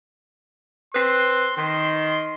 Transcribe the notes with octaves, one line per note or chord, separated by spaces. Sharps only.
C4 B4 C6
D#3 C6